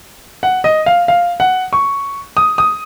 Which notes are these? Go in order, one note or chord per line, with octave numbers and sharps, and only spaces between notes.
F#5
D#5
F5
F5
F#5
C#6
D#6
D#6